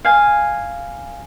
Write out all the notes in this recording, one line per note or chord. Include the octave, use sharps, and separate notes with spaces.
F5 G#5